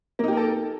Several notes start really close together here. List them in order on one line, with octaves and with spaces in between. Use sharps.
A#3 D#4 G4 A#4 A4